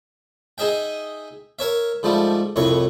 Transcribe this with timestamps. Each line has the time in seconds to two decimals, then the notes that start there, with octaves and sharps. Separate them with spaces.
0.58 D#4 G#4 D#5 E5 G5
1.59 A#4 C#5 E5
2.03 G#2 F3 G3 A3
2.56 C2 F2 A2 C#5 C#6